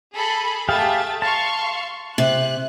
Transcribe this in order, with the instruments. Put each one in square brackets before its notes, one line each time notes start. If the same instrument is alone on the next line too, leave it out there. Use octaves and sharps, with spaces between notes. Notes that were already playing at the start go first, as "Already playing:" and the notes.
[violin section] G#4 A4 B5
[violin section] A3 E5 A6 [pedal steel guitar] G4 G#4 F5
[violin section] F5 C6 C#6 [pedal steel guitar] A5
[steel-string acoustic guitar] C3 [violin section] F#6